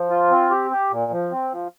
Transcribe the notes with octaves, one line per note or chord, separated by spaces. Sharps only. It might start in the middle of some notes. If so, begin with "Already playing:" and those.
Already playing: F3
F4
C4
G4
G4
A#2
F3
C4
F3